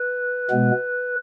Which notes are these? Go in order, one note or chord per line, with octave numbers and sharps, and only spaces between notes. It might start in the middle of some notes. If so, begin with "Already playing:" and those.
Already playing: B4
B2 G#3 B3